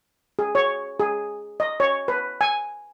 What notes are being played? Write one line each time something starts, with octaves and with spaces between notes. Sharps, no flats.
G#4
C#5
G#4
D#5
C#5
B4
G#5